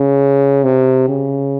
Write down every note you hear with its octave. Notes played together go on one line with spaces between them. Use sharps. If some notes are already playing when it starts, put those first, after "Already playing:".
Already playing: C#3
C3
C#3